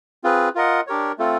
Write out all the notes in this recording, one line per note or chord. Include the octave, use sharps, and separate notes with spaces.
C4 F4 G#4 B4
F4 A#4 D#5 F#5
D4 G4 A#4 C#5
A3 C4 F4 A4